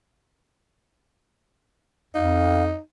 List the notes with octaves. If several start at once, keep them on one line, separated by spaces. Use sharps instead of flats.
F2 D#4 F5